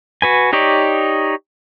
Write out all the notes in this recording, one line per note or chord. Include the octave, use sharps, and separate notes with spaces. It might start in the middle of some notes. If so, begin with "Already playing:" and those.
F#4 B4 G#5
D#4 G4 C#5 D5